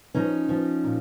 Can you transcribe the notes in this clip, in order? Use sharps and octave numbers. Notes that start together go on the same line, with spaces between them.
F3 C#4 D#4
F3
A#2